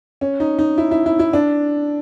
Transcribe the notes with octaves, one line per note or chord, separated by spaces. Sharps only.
C#4
D#4
D#4
E4
E4
E4
E4
D4